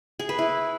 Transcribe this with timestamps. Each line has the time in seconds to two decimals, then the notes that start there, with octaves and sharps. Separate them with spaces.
0.19 G#4
0.29 B4
0.39 E4